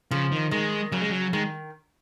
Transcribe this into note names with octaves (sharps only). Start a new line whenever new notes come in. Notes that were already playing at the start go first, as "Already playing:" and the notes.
C#3 F3
D#3
D#3 G#3
C#3 F#3
G#3
F#3
D#3 G#3